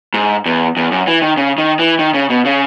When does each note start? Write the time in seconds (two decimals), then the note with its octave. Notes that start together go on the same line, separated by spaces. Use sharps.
0.14 G#2
0.46 E2
0.77 E2
0.92 F#2
1.07 E3
1.22 D#3
1.37 C#3
1.58 D#3
1.79 E3
1.99 D#3
2.14 C#3
2.30 B2
2.45 C#3